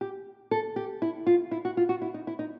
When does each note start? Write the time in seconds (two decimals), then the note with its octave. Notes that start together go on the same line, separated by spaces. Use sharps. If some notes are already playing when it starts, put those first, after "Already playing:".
0.01 G4
0.51 A4
0.76 G4
1.02 E4
1.27 F4
1.51 E4
1.65 F#4
1.77 F4
1.89 F#4
2.02 E4
2.14 D#4
2.27 E4
2.39 D#4